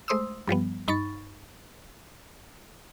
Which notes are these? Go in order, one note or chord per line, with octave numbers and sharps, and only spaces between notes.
G#3 A3 C5 C6 D#6 E6
G2 F3 G3 B3
G2 D#4 B5 C#6 A6